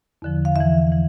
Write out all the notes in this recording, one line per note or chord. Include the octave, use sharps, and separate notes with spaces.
E2 D3 F3
F5
E2 E3 E5
E3